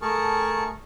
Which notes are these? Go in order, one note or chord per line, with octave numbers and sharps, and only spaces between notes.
A3 G#4 A#4 A5 C#6